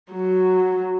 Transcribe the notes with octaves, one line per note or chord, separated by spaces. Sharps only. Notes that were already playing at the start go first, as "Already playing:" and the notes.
F#3